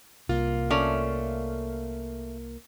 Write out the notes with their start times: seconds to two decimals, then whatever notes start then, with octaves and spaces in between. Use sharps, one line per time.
0.29 C2 A#3 F4
0.70 A3 C#4 D5